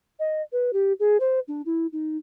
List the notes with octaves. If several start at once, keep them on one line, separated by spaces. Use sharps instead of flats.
D#5
B4
G4
G#4
C5
D4
E4
D#4